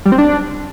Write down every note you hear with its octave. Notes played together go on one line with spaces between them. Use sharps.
G3
C4
D4